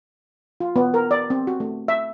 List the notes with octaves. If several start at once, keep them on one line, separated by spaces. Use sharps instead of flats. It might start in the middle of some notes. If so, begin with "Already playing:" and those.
F4
B3
A#4
D5
C4
F#4
A3
E5